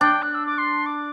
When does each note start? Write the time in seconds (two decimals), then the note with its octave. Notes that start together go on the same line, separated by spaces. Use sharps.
0.01 D4 G5
0.23 F#6
0.34 E6
0.46 D6
0.58 C6
0.86 D6